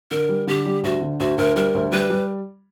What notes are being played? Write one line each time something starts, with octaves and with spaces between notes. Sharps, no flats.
D3 A#4
G3
D3 G4
G3
D2 F#4
D3
D2 F#4
D2 A#4
G3 A#4
D2
G3 B4
G3